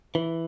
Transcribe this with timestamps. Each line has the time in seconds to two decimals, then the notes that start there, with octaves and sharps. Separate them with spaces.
0.15 E3